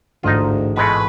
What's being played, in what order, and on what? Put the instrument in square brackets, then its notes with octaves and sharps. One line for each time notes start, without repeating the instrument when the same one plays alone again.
[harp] A1 G#2 D#5 [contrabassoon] D2 [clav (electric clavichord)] D#4 F4
[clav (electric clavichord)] B2 G#3 A3 [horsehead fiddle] B4